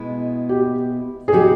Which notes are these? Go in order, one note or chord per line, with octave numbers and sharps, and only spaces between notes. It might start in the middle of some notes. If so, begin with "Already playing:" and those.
Already playing: B2 G#3 B3 E4
G4
G#4
C#3 F#3 B3 D#4 F#4 G4